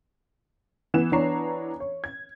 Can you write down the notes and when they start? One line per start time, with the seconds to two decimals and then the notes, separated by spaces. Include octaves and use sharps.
0.94 E3 B3 E7
1.12 E3 B3 D4 C#5 A#5 C7
1.80 C#5
2.04 G#6